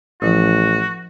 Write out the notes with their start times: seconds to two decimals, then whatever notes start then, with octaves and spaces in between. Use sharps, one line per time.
0.22 A1 F3 E4 F#4